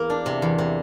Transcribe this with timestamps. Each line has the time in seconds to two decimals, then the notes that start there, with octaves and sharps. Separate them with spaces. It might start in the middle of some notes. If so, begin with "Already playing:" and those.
Already playing: E2 A#3
0.10 D4
0.26 C3
0.42 E2
0.58 C3